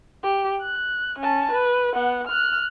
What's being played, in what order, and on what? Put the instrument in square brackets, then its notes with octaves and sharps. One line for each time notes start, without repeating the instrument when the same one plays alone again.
[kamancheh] G4
F#6
C#4 A5
B4
B3 F#5
F6 F#6